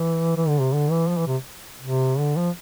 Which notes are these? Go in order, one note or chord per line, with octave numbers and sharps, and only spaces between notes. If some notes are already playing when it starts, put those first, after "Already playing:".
Already playing: E3
E3
D3
C3
D3
E3
F3
E3
C3
C3
D3
F3